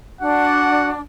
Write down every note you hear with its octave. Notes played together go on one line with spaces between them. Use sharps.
D4 F#4 F#5